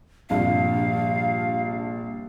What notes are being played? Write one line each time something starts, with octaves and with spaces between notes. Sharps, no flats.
A#1 G2 C3 F5